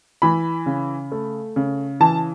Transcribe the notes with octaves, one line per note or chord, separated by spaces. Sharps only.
E3 B5
C#3
A3
C#3
E3 A5